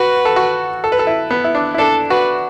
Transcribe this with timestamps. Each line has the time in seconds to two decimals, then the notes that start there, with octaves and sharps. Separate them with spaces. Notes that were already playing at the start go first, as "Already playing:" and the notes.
Already playing: F#4 B4
0.25 A4
0.36 F#4
0.84 A4
0.92 B4
0.99 A4
1.07 E4
1.31 B3
1.44 E4
1.55 D4
1.74 E4
1.78 D4 A4
2.10 F#4 B4